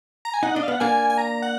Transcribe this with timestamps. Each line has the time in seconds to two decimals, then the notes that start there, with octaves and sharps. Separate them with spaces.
0.25 A#5
0.34 G#5
0.43 D#4 F#5
0.55 D4 D#5
0.63 F5
0.68 B3 F#5
0.80 A#3 D4 G#5
1.10 G#5
1.18 A#5
1.42 F#5